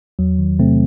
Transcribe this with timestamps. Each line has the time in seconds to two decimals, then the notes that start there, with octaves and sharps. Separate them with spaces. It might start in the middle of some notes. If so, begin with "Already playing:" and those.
0.19 E2 F#3
0.39 D#3
0.59 C3 A3 C4